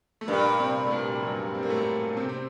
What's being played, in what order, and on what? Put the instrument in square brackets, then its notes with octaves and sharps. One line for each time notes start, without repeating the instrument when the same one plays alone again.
[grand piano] A3
[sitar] G2 [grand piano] A#2 A#3
[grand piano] C3 C4
A3
A#2 A#3
G3
F#2 F#3
C4
A#3
A2 A3
C3 C4
C4